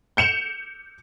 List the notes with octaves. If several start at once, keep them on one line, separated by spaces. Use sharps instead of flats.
G6 C#7 E7 F7